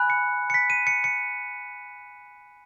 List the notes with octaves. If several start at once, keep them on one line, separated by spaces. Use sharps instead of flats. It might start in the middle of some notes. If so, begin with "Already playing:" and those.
Already playing: G#5 B5 F#6
C#7
C#7
B6
D#7
C#7
C#7